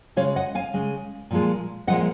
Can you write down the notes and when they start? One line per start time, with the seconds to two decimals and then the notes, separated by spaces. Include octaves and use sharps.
0.16 C#3 G#3 C#5 F5
0.36 D#5 F#5
0.55 F5 G#5
0.74 C#3 G#3
1.31 A#2 F3 G#3
1.87 A#2 F3 G#3 D#5 F#5